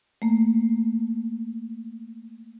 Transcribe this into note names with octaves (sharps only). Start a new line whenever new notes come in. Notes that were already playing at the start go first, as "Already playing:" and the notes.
A3 A#3